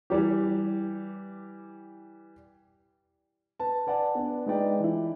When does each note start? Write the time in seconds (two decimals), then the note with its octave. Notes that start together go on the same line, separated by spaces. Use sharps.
0.10 E3 G3 G4
3.60 B4 A5
3.87 B4 D5 F#5 G#5 A5
4.15 B3 D4
4.46 G#3 D#4 B4 D5 G5
4.80 E3 E4